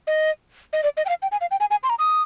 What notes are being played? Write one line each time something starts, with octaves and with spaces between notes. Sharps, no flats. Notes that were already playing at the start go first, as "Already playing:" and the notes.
D#5
D#5
D5
D#5
G5
F5
G5
G#5
F5
G5
G#5
G#5
C6
A#5
D#6